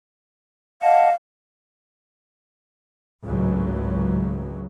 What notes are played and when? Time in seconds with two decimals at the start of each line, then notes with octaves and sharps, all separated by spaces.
0.82 D#5 F5 F#5 A5
3.24 G#1 C#2 A2 F#3